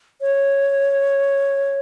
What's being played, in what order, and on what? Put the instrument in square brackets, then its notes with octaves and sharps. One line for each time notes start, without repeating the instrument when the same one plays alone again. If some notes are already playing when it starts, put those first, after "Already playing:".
[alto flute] C#5